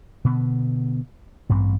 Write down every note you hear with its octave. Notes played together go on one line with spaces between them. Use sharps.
B2 D3 B3
A1 G2 C4